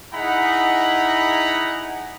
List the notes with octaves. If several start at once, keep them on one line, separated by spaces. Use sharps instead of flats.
D#4 E4 G#4 F#5 A#5 B5